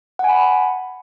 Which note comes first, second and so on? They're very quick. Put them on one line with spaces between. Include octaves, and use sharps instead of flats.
F#5 G#5 B5